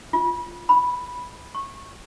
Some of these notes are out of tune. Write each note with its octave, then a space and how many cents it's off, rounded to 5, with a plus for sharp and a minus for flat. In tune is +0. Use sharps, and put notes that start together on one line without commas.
F4 +0
B5 -5
C#6 -20